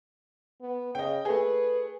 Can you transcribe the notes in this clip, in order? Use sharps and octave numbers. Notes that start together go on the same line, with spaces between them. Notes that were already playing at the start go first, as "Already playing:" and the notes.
B3
C#3 D#5 G5
A3 G#4 B4